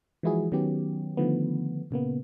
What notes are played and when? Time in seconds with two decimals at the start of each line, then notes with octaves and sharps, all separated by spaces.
0.23 E3 F3 G#3 E4 F#4 G#4
0.52 D#3 F#3 B3 C#4 G4
1.17 D3 D#3 F3 A3 B3
1.91 A#2 C#3 A#3 B3